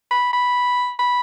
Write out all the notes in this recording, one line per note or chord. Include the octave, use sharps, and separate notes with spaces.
B5
B5
B5